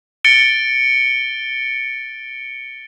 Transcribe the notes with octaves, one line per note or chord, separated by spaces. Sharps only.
A6 C#7 D7 G7